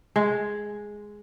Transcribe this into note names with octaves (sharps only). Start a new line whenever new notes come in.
G#3